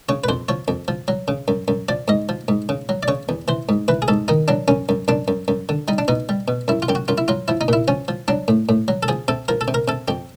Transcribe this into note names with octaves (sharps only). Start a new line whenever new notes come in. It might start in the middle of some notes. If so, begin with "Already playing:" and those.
C#3 C#5
B4
F2 C5
F3 C#5
F2
F3
F#3
C#3
F#2
F#2
F3 D5
G#2 D#5
F3
G#2
C#3
F#3
D5
C#3 C#5
E2
E3 C5
G#2
E3 B4
G#4
G#2 A4
D#3 D#4
F#3 D4
F#2 C#4
F#2
F#2 D4
F#2
F#2
D3
G3 D#4
D4
B2 D#4
G3
B2
F#2 E4
F4
F#2 G4
F#4
F#2 F4
E4
F#3 F4
F3 E4
D#4
A#2 E4
F3 C#4
F3
F#3 D4
A2
A2
F#3
A4
F3 G#4
C3 A4
F3 A#4
A4
C3
A#4
C3 A4
F2 G4